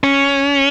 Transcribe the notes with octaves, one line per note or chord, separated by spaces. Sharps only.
C#4